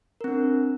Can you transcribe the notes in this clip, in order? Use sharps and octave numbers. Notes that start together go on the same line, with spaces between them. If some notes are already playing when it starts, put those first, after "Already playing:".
C4 D4 A#4